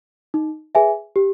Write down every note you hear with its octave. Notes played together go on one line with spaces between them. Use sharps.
D#4
G#4 B4 E5 G#5
G4